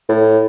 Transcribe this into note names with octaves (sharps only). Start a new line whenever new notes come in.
A2